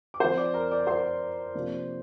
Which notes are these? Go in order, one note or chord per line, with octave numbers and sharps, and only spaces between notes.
D6
F3 C4 D#4 C5 C6
D5 D6
A#4 A#5
D5 D6
C5 C6
C3 F3 A#3 D4